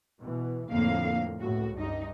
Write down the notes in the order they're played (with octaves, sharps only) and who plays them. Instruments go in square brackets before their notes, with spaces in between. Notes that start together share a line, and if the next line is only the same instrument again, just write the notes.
[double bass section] B2 E3
[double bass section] F2 A2 [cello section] D3 A#3 F5
[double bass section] C#2 A2 [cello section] F#4
[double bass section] G2 [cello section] D#4